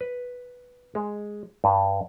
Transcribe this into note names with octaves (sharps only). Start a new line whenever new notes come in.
B4
G#3
G2